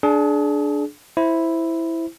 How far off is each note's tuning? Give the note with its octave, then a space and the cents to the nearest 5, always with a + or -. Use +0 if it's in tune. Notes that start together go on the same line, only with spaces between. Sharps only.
D4 +0 G#4 +30
E4 +0 C5 +0